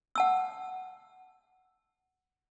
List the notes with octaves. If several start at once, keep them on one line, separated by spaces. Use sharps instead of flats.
F#5 A5 E6